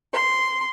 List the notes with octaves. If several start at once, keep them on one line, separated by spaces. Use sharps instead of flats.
C6